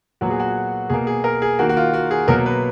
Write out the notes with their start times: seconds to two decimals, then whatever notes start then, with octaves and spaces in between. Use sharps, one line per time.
0.21 A#2 F#3 B3 F#4
0.30 G#4
0.40 F#4
0.90 B2 A#3 G#4
1.07 G#4
1.24 A#4
1.42 G#4
1.59 D#3 A#3 F#4
1.69 F#4
1.77 F4
1.94 F#4
2.11 G#4
2.28 B2 F#3 A#3 A#4
2.46 B4